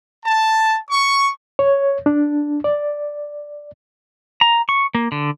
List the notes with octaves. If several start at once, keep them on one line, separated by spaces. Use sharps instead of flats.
A5
C#6
C#5
D4
D5
A#5
C#6
A#3
D3